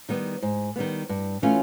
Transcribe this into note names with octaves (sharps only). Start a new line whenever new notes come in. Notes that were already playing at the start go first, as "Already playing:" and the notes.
D#3 G3 B3
G#2
D#3 G3 B3
G2
E3 A3 C#4 F4